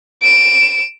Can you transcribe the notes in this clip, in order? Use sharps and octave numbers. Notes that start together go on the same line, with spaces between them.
D7 E7